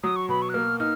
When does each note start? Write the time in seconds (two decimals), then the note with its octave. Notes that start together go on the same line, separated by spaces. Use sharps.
0.03 F#3 D#6
0.16 C#6
0.29 B2 B5
0.42 C#6
0.49 F#6
0.54 A#3 F6
0.80 D#4 F6